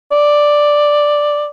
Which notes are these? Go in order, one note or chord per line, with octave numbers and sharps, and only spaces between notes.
D5